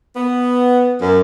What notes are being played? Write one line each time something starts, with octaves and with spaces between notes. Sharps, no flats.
B3
F#2